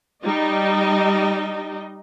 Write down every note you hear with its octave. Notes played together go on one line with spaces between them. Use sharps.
G3 D#4 D#5